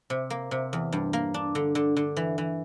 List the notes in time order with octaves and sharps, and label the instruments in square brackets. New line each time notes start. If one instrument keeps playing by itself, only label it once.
[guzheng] C3
A#3
C3
E2
G2
A#3
D4
D3
D3
D3
E3
E3